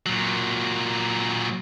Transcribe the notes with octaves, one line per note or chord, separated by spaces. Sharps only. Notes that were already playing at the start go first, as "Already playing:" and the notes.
A#2 F#3